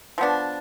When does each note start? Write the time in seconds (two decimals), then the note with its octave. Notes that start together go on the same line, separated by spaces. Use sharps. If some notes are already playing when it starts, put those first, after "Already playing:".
0.18 F3 B3 D4